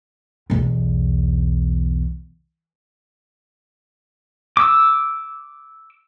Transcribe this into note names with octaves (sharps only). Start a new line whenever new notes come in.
B1 E2
D6 E6